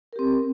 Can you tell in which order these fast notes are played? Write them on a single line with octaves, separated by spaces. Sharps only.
A#4 G4 C4